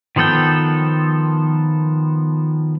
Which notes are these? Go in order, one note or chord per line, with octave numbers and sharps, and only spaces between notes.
D#3 F3 B3 A4 G5